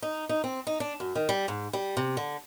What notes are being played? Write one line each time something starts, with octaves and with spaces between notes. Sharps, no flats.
D#4
D#4
C4
D#4
D4
F#2
D#3
G3
G#2
G3
C3
D3